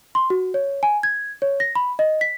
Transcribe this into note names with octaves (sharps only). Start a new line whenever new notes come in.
C6
F#4
C#5
G#5
G#6
C#5
A#6
B5
D#5
B6